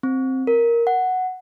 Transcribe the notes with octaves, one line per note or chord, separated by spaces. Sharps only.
C4
A#4
F#5